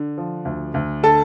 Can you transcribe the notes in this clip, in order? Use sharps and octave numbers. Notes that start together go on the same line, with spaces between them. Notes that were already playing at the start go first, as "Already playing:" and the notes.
Already playing: D3
F3
D2
D2
D3 A4 A5